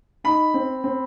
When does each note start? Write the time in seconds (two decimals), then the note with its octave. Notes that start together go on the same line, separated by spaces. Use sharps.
0.24 D#4 B5
0.54 C4
0.84 C4